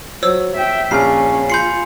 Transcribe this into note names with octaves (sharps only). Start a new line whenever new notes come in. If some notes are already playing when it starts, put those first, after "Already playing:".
F#3 C5 C#5 E6
E5 G5
A#1 C#4 G#5 F6 C7
F4 B5 C6 G6 C7 C#7